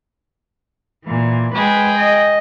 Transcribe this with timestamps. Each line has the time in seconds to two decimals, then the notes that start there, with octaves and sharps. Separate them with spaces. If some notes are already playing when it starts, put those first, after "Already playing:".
1.05 A#2 E3
1.55 G#3 G#4 B4 G5
1.98 D#5